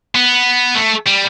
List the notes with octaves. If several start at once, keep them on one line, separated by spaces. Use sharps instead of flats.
B3
A3
G3